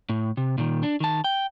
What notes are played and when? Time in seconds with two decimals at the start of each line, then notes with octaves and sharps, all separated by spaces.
0.09 A2
0.37 C3
0.58 A#2 D#3
0.83 D4
1.00 D#3 A5
1.24 G5